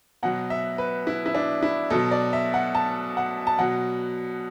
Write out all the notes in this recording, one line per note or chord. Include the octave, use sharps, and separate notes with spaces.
B2 F#3 F#5
E5
B4
E4
E4
D4
E4
B2 F#3 A4
D5
E5
F#5
A5
F#5
A5
B2 F#3 F#5